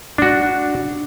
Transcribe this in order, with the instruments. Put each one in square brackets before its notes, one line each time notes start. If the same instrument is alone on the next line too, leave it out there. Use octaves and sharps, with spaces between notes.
[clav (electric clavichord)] D4 F#4